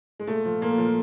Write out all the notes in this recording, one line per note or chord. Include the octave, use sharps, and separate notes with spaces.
G#3
A#2 A3
F3
A#2 A#3
F3